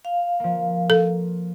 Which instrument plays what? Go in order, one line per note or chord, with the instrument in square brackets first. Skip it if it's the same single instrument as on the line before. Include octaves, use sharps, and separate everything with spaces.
[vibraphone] F5
[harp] F3 A#3
[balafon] A4